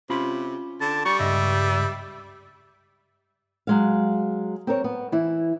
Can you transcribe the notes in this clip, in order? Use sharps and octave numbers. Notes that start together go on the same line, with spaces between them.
C3 C#4 F4 B5
D3 A5
G3 C#6
C#2 G2 D#5 E5
F#3 G#3 F5
C4 A#4 C#5
B3
E3 E4